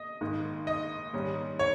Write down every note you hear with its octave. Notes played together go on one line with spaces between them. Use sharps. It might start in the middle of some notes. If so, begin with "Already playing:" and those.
Already playing: D#5
G#1 G#2 D#3
D#5
G#2 D#3 G3 C#4
C#5